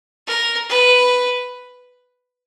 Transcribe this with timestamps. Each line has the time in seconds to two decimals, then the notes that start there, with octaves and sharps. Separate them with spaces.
0.27 A#4
0.69 B4